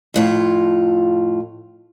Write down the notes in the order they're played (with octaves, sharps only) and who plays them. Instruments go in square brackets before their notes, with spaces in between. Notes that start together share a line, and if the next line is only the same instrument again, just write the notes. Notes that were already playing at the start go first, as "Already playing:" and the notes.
[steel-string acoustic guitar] F2 A2 F4